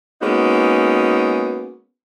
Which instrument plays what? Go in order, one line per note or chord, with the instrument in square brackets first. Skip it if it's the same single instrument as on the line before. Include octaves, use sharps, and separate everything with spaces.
[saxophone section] G#3 A#3 B3 C#4 D#4 F#4